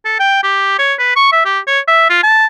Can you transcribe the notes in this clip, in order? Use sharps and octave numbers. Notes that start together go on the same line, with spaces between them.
A4
G5
G4
C#5
B4
C#6
E5
G4
C#5
E5
F4
A5